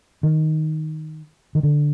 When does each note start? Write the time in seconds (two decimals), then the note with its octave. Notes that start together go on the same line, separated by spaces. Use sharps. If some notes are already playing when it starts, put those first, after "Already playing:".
0.23 D#3
1.55 D#3
1.63 D3